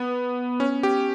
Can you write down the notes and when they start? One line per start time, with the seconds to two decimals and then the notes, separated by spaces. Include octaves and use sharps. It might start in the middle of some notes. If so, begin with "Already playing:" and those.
Already playing: B3
0.60 C#4
0.83 G4